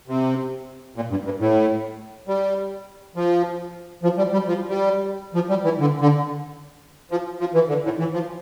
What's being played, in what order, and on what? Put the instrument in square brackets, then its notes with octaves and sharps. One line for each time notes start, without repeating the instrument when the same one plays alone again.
[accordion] C3
A#2
G2
G2
A2
G3
F3
F3
G3
G3
F3
G3
F3
G3
E3
D3
D3
F3
F3
E3
D3
A2
E3
F3